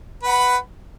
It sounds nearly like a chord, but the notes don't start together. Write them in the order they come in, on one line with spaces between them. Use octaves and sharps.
B4 F#5 B5